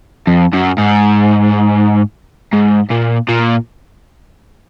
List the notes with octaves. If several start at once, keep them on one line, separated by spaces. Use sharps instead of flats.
F2
F#2
G#2
G#2
A#2
A#2